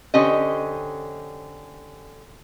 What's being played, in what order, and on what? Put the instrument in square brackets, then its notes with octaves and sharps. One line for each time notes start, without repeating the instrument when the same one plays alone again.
[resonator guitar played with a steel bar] D3 C#4 G4 C5 D#5